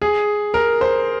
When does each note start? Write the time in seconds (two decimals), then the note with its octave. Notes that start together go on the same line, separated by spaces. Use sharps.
0.02 G#4
0.54 A#4
0.81 C5